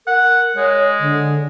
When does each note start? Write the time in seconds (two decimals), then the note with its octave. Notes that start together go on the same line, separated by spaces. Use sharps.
0.07 A#4 F#5
0.56 G#3 C#5
1.00 D3